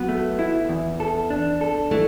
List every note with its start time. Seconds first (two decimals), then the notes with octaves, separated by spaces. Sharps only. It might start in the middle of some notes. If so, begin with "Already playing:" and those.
Already playing: F#3 B3
0.09 A3
0.39 E4
0.69 E2
1.00 A4
1.30 D4
1.61 A4
1.91 E3 A3